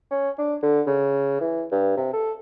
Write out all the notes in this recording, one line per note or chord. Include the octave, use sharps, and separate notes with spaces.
C#4
D4
D3
C#3
E3
G2
C3
A4